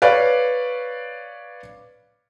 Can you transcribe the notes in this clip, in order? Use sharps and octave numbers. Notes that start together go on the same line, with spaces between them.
B4 C#5 D5 F5